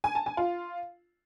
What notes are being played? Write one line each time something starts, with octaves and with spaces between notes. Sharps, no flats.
G#5
A5
G#5
F4